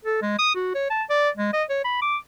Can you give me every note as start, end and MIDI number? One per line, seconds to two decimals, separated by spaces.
0.05 0.21 69
0.22 0.34 56
0.39 0.53 87
0.55 0.73 66
0.75 0.90 73
0.90 1.03 81
1.10 1.30 74
1.37 1.53 56
1.53 1.63 75
1.70 1.84 73
1.84 2.00 83
2.02 2.17 86